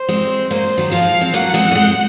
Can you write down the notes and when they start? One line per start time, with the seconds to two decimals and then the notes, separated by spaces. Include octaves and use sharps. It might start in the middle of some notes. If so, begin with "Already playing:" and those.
Already playing: C5
0.09 G#3 C4
0.50 F#3 A#3 C5
0.77 D#3 F#3
0.91 F3 G#3 F5
1.21 C4
1.34 F#3 A#3 F#5
1.54 G#3 C4
1.71 A#3
1.75 G#3 C4